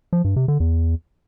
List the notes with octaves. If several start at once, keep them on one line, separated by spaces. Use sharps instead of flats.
F3
G2
C3
D3
E2